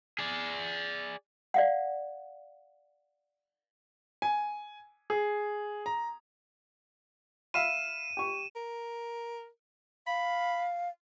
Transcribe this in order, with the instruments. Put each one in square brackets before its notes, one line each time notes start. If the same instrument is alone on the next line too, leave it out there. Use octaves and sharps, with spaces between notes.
[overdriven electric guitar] G#4 D5
[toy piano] D5 F5 F#5
[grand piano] G#5
G#4
A#5
[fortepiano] E5 F5 B5 [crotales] D#7 E7
[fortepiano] G4 C#6
[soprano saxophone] A#4
[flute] F5 [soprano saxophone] B5